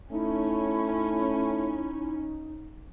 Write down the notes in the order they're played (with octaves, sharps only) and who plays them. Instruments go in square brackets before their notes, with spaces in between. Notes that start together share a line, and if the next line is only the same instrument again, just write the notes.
[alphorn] A3 [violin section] C#4 [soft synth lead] D#4 [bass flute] E4